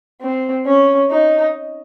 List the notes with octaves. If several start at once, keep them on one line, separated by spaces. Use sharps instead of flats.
C4
C#4
D#4